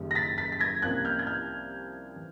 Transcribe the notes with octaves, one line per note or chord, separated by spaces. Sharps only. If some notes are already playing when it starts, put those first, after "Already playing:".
Already playing: F#1 F#2 D#3 G3
A#6
A6 B6
A6 B6
B6
G#6 A#6
C2 C3 F3 A#3 C#4 F#6 G#6
F6 G6
G#6
F6 G6
E3